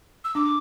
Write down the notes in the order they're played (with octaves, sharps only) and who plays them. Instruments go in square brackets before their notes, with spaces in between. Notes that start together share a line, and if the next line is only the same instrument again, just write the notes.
[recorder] E6
[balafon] D4 [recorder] D6